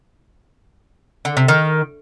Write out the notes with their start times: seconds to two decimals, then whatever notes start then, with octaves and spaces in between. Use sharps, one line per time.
1.25 D3
1.37 C3
1.48 D#3